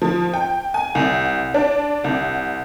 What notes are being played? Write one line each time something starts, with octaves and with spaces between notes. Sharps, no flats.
F3
G5
G#5
C2
D4
C2